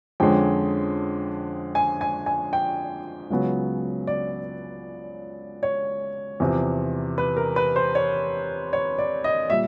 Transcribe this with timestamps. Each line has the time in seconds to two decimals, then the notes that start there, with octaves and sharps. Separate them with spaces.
0.20 F2 D3 F3 G#3 C#4 G5
1.75 G#5
2.01 G#5
2.26 G#5
2.53 G5
3.30 C#2 C#3 F#3 B3
4.07 D5
5.63 C#5
6.40 E2 C3 F3
7.18 B4
7.37 A#4
7.56 B4
7.76 C5
7.95 C#5
8.73 C#5
8.99 D5
9.24 D#5
9.50 A#2 G3 E5